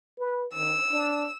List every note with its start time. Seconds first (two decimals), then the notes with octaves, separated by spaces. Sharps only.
0.19 B4
0.54 D#3 E6
0.91 D4